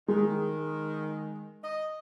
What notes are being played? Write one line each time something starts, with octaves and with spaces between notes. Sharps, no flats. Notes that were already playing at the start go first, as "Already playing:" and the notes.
D#3 G#3
D#5